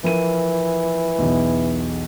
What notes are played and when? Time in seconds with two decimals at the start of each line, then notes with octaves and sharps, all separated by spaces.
0.04 E3 F3 A#4 D#7
1.19 B1 E2